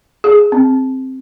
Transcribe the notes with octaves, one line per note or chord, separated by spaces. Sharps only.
G#4
C4